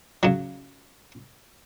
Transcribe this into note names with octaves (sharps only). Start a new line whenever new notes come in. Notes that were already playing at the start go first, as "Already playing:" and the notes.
C#3 F#3